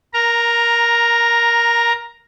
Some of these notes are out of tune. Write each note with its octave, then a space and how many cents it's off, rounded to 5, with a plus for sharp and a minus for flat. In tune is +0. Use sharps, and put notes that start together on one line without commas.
A#4 +15 A#5 +0